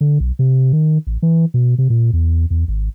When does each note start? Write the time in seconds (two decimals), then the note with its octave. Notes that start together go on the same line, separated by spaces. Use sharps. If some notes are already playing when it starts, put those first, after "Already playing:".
0.01 D3
0.20 B1
0.39 C3
0.73 D#3
1.07 A1
1.22 E3
1.54 B2
1.78 C3
1.90 A#2
2.13 E2
2.50 E2
2.68 G#1